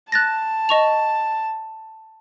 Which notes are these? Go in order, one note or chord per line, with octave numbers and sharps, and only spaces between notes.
A5 F#6 A6 A#6
D#5 C#6 F7